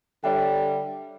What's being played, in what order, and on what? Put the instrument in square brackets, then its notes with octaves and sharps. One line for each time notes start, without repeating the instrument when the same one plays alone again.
[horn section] D3 G3 [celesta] C#5 E5 G5